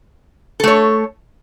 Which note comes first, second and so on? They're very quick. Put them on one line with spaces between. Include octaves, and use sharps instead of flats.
A4 A3 C#5